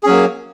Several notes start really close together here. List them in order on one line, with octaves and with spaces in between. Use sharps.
G#4 C#4 F#3 A#3